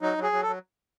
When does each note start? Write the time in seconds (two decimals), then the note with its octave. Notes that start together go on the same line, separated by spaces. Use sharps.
0.02 F#3 D#4
0.18 F#3
0.23 G#4
0.32 F#3
0.43 A4
0.47 F#3